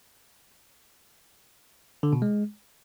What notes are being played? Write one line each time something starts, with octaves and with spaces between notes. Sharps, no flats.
D3
B2
G#3